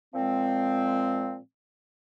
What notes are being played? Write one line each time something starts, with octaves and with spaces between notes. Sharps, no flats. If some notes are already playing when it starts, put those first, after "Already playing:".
A#2 F3 G#3 C4